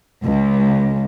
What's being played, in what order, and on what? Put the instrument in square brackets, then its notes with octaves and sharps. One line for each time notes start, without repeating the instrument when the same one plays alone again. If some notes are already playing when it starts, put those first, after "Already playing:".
[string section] C#2